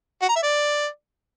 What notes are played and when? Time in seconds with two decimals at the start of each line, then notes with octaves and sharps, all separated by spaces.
0.22 F#4
0.29 A#5
0.36 E5
0.43 D5